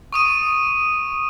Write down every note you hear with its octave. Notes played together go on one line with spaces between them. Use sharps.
C#6 D#6 D#7